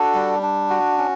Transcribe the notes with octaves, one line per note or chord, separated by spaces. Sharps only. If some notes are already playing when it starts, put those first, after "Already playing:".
Already playing: D4 F#4 A4
G3
D4
F#4
C#4